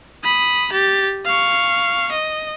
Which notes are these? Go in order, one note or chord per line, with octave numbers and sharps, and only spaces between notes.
B5 D#6
G4 A6
F5 C#6
D#5